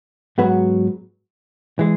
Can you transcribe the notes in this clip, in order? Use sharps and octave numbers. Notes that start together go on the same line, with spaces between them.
G#2 F#3 B3 F#4 B4
E3 G#3